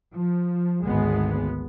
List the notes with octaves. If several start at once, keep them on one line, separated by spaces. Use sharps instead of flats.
F3
G#1 D2 G#3 B3